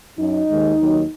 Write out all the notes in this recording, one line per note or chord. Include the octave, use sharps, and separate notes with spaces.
F#2 F#3 D#4
D#2 D#3 G#3
D#2 D#3 F#3